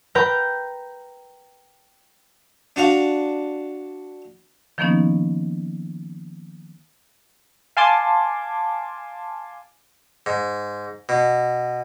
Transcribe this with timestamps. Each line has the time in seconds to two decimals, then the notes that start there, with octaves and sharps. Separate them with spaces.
0.15 B4 G5 A#5 F6 G6
2.76 D4 F#4 F5
4.78 D#3 F3 A#3 B3 C#4 D#4
7.77 F5 G#5 A5 C6 D6
10.26 G#2
11.09 B2